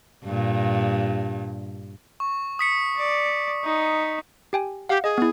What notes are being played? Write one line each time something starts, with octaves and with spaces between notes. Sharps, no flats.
G2 A#2
C#6
D#6 B6 C#7
D5
D#4
G4 G5 G#5
G4 F5 F#5
G#4 D#5
B3 E4